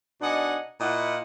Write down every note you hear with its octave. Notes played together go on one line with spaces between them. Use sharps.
B2 D4 D#4 D#5 F#5 G#5
A#2 E4 F4 D#5 F#5